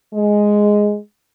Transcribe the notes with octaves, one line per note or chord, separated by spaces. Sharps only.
G#3